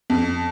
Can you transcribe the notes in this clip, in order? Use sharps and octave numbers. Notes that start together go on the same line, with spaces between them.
F2